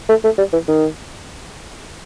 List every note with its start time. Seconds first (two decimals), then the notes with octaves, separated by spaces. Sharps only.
0.09 A3
0.24 A3
0.38 G3
0.53 E3
0.68 D#3